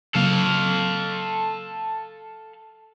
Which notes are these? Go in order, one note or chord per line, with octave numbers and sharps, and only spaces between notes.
C#3 F#3 A#3 A4 F5